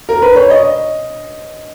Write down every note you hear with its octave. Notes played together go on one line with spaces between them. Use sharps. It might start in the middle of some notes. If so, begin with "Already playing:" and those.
A#4
B4
C#5
D#5